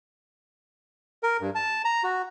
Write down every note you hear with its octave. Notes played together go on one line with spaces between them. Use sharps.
A#4
G2
A5
A#5
F#4